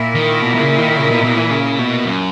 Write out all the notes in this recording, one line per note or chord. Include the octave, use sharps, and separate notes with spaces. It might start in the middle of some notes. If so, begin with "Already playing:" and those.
Already playing: A#2 A#3 E4
D#3
B2
B2
C#3
D#3
C#3
B2
B2
E3
C#3
B2
F#2